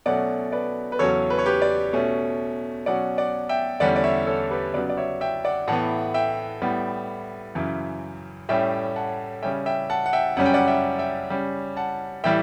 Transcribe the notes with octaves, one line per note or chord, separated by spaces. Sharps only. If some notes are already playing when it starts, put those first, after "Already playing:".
B2 F#3 A3 C#4 D5 F#5
B4 D5
B4
E2 C#3 F#3 C#4 A4 C#5
B4
C#5
G4 B4
B4 D5
B2 A3 C#4
B2 F#3 C#4 D5 F#5
D5 F#5
E5 G5
E2 D3 G3 C#4 D5 F#5
D5
C#5 E5
A4 C#5
G4 B4
C#3 F#3 B3 B4 D5
D5
C#5 E5
E5 G5
D5 F#5
A2 E3 B3 F#5 A5
E5 G5
A2 G3 B3
F#2 C#3 E3
A2 G3 C#4 E5 G5
F#5 A5
C#3 G3 C#4 E5 G5
E5 G5
F#5 A5
F#5
E5 G5
F#2 C#3 G3 C#4 F#5
G5
D5 F#5
E5 G5
E5 G5
C#3 G3 C#4
F#5 A5
A2 E3 G3 E5 G5